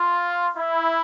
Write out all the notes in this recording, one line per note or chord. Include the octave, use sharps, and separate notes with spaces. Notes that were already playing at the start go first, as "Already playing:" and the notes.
Already playing: F4
E4